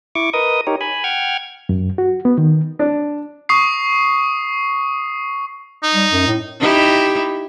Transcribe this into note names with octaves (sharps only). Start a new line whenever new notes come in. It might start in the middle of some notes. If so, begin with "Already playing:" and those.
E4 C#6 D6
A#4 B4 D#5 D#6
D#4 G4 A#4 C#5
G#5 B5
F#5 G5 F6 G#6
F#2
F#4
B3
D#3
D4
C#6 D#6 C7
D#4
G3
F#2
A2
D#4 E4 G4